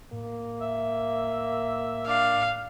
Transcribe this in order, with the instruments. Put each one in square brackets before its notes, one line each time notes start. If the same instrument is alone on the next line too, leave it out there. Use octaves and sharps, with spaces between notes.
[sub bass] A2 [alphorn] A#3
[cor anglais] E5
[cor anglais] D4 [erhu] F5